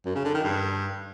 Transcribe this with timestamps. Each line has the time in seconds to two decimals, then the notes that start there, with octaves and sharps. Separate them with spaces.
0.05 F#2
0.15 C#3
0.25 D3
0.34 D#3
0.44 G2